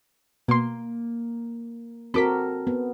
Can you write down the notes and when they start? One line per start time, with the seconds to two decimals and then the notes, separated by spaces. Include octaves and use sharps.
0.48 B2 A#3 C6
2.14 C4 F#4 A4 A#4 B5 D6 B6
2.67 B3